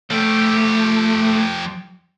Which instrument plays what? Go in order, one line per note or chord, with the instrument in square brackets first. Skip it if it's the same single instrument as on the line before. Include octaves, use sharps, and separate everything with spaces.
[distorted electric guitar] F3 G4 [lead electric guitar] A3